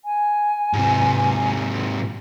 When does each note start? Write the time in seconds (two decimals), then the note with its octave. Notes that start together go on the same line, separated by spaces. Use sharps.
0.05 G#5
0.73 G#2 C3